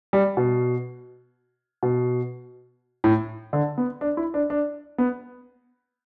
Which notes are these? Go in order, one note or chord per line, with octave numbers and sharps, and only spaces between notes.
G3
B2
B2
A2
D3
B3
D4
E4
D4
D4
B3